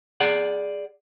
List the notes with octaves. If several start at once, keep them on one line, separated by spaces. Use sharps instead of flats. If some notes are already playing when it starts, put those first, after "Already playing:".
G#4 D5 F#5